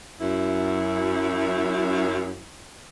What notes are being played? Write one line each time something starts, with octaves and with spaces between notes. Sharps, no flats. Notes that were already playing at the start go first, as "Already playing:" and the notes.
F#2 E4